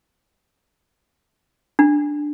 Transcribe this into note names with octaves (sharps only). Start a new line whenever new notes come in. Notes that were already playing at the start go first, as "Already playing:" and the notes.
D4